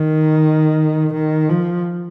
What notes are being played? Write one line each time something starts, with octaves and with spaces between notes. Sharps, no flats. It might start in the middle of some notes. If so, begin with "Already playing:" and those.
Already playing: D#3
D#3
F3